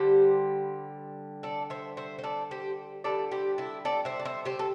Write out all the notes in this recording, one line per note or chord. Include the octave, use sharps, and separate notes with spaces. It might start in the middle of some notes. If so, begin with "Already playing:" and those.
Already playing: D3 G3 G4 C5
A4 D5
C5 E5
C5 E5
C5
A4 D5
G4 C5
D3 G3 A4 D5
G4 C5
E4 A4
A4 D5
C5 E5
D5
C5 E5
G4 C5
A4